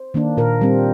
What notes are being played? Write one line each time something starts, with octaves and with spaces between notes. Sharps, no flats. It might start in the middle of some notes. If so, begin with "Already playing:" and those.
Already playing: C5
D#3 A#3 D4
A#2 A#4
G3 C4